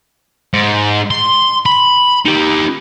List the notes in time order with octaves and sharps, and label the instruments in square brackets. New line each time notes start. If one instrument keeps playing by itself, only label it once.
[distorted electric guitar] G#2
C6
B5
D#4 G4